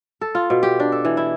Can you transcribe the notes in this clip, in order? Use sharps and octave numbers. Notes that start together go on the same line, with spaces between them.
A4
F4
B2
G4
D4
A4
E3
E4